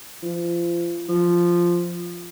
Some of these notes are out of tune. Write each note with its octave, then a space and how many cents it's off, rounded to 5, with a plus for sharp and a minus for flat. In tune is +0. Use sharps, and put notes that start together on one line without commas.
F3 -30
F3 -5